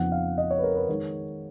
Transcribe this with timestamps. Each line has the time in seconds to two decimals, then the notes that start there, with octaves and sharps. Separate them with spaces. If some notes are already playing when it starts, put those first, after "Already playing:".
Already playing: F2 C#3 F3 B3 D#4 F#5
0.12 F5
0.38 D#5
0.51 C#5
0.58 B4
0.64 A#4
0.76 B4
0.89 D#3 G#3 D#4 C#5